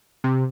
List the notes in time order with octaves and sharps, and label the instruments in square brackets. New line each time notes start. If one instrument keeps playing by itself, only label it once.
[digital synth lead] C3